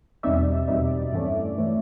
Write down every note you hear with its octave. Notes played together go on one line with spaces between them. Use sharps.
E2 B2 G3 C4 D#4 D5 E5
E2 B2 G3 C4 D#4
G2 E3 A3 C#4
E3 A3 C#4